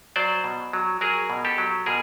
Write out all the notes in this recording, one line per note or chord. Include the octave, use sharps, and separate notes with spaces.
F#3 C5 D5
B2
F#3
F#3 G#4 A#4
B2
G4 A4
F#3
B2 G#4 A#4